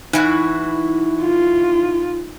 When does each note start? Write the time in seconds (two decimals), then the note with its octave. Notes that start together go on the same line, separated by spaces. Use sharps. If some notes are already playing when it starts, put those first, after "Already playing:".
0.13 E3 D#4 E4 F#4
1.22 F4